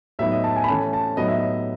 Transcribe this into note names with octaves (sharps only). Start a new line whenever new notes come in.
A2 F#3 B3 D#4 E5
D#5
A5
G#5
B5
E3 A3 C#4 A5
A5
A2 F#3 B3 D#4 D#5
E5
D#5